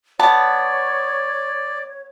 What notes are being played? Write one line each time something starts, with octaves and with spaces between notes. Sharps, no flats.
B3 C#5 D5 A5